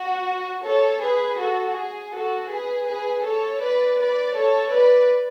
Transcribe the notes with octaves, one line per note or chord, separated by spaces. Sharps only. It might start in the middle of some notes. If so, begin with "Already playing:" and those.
Already playing: F#4
A4 C#5
G#4 B4
F#4 A4
G#4
F#4 A4
G#4 B4
G#4 B4
A4 C#5
B4 D5
B4 D5
A4 C#5
B4 D5